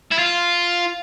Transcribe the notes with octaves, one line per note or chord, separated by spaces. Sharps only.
E4
F4